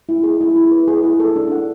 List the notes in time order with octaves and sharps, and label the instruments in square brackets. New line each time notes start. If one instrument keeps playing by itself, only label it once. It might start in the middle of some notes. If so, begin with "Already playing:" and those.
[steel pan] E4
G#4
E4
E4
B4
G#4
E4
A4
D4
F#5